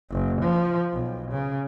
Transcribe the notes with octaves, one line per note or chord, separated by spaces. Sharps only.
F#1
F3
B1
C#3